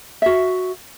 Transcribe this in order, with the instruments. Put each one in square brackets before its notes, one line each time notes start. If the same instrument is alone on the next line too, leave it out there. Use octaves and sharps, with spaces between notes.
[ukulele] F#4 E5